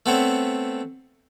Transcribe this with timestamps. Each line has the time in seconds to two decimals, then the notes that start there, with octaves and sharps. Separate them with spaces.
0.06 A3 B3 C4 C#5